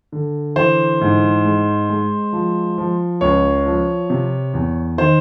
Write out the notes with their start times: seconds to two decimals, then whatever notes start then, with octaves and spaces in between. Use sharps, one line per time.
0.12 D3
0.56 E3 C5
1.01 G#2
1.45 G#3
1.90 G#3
2.33 F3
2.78 F3
3.21 C#2 C#5
3.66 F3
4.10 C3
4.54 E2
4.98 D#3 C5